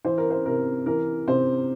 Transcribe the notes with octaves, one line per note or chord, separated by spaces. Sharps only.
E3 C5
A#4
C5
C3 A#4
E3 A#4
C3 C5